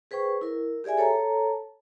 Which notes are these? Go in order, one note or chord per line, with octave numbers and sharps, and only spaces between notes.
G#4 B4 C5 G5 C#6
E4 A#4
G4 G#4 D5 E5 G#5
A4 C#5 A5 A#5